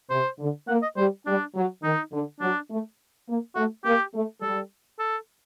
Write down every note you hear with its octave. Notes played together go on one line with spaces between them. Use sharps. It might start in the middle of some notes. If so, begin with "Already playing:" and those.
C3 C5
D3
A#3 F#5
D#5
G3 C5
G3 D4
F#3
D#3 D#4
D3
F#3 D4
A3
A#3
A3 F#4
A#3 G4
A3
G3 A4
A4